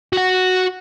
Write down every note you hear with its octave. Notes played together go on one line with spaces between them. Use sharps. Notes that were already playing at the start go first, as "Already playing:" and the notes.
F#4 F#5